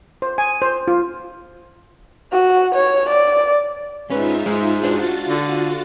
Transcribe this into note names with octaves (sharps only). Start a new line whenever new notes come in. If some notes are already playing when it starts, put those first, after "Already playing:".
C5
G#5
C5
F4
F#4
C#5
D5
G#2 C#4 D#4 F4 B4 E5
G#2 G#3
D4 F4 F#4 C5 A6
D3